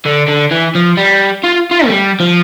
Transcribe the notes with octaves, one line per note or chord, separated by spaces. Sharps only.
D3
D3
E3
F3
G3
F4
F4
A3
G3
F3